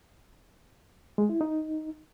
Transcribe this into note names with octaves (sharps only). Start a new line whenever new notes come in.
G#3
E4
D#4